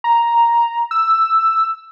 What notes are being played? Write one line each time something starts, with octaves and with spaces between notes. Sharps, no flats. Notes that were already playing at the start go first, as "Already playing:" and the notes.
A#5
E6